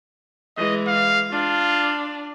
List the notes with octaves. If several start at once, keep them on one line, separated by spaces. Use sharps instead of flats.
E3 G#3 D#5
F5
D4 F4